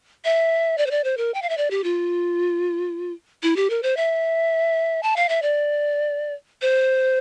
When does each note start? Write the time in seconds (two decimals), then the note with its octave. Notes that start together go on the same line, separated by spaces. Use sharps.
0.25 E5
0.78 D5
0.86 C5
0.91 D5
1.04 C5
1.17 A#4
1.34 G5
1.42 F5
1.49 E5
1.57 D5
1.71 G4
1.84 F4
3.43 E4
3.56 G4
3.70 A#4
3.83 C5
3.97 E5
5.03 A5
5.16 F5
5.29 E5
5.42 D5
6.62 C5